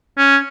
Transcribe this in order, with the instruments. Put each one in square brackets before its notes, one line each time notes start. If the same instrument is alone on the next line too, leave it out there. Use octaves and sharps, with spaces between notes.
[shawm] C#4